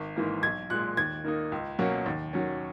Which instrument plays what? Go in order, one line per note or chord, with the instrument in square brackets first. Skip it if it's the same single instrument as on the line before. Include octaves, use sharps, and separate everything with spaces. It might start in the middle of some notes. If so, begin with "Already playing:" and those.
Already playing: [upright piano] G#1
G#2 E3 A#3
B1 G#6
A#2 G#3 F#6
D#2 G#6
D#3 A#3 D#4
C#2
B2 F#3 A#3 C#4
D#2
D#3 F#3 C#4